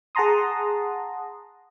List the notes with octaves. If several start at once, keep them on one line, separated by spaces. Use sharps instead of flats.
G#4 F#5 A5 A#5 C6 D#6